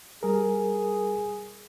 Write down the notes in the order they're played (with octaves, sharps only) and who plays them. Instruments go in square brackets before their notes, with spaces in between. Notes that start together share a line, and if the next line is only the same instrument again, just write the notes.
[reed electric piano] G3 A#4 [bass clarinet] G#4